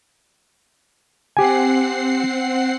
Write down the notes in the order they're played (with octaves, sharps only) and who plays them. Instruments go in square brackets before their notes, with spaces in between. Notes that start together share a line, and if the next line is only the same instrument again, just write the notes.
[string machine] C4 F#5 C7 [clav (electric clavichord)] G4 G#5